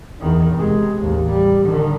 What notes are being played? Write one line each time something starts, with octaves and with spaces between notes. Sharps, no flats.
E2 D#3
C3 G#3
A1 D#2
G3
D3 D#3